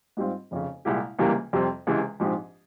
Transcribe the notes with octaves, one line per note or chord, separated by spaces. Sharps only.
G#2 G3 C4 F4
F1 F2 C#3
C2 A#2 G#3 E4 G4
C#2 C3 E3 G3 A#3
F2 C3 G3 C4
C#2 C3 E3 G#3
A#1 G#2 F3 C4 G4